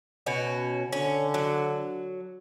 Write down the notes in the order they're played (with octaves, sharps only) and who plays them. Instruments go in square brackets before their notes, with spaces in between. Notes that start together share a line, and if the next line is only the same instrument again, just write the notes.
[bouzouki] B2 C#4 F#4
[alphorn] D3 [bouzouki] C#4
[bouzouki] F#3